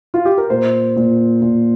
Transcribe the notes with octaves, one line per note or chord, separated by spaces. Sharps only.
F4
G4
A#4
A#2 C5
A#2
A#2